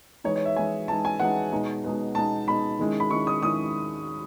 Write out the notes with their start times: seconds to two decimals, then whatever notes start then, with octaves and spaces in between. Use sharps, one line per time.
0.24 E3 G#3 D#4 C#5
0.36 C#5
0.45 E5
0.56 E3 G#3 D#4 G#5
0.88 E3 G#3 D#4 A5
1.05 G#5
1.19 E3 G#3 D#4 F#5
1.52 B2 G#3 D#4
1.84 B2 G#3 D#4
2.15 B2 G#3 D#4 A5
2.48 B2 G#3 D#4 B5
2.79 D#3 G#3 C#4 E4
3.00 B5
3.11 D#3 G#3 C#4 E4 C#6
3.27 D#6
3.42 D#3 G#3 C#4 E4 D#6